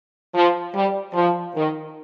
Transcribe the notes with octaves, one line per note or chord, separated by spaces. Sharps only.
F3
G3
F3
D#3